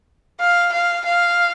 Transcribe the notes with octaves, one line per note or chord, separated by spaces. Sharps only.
F5
F5
F5